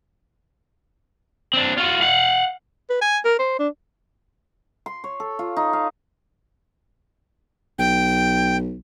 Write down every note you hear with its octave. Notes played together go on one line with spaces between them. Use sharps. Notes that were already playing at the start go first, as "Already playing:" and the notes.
C4 D4
F4 F#4
F5 F#5
B4
G#5
A#4
C5
D4
C6
C#5
A4
F4
D#4
F5
B1 G5